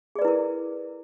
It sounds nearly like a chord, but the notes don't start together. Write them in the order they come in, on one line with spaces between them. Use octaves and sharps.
G#4 D5 B4 E4 A#4